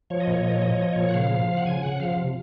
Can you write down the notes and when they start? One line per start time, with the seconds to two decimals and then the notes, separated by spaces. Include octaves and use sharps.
0.10 F3 C#5
0.20 D#5
0.27 A#2 C#5
0.42 F3 D#5
0.52 C#5
0.61 F3 D#5
0.72 C#5
0.78 F3 D#5
0.93 A#2 C#5
1.09 F#5
1.14 C#3 F5
1.30 F3
1.48 F3
1.57 F#5
1.65 C#3 G#5
1.82 C#3 F#5
2.00 F3 F5
2.17 C3